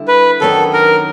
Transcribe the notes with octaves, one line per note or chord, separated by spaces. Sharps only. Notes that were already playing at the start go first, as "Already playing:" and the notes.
Already playing: D3 G3 E4
B4
F#2 D#3 F#3 B3 D4 A4
A#4